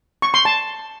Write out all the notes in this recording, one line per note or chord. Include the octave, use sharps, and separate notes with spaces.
C#6
C6
A5